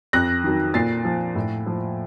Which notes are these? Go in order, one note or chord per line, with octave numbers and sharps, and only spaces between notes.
F2 F#6 A#6
D#3 F#3
A#2 A6 C7
F3
A2
F3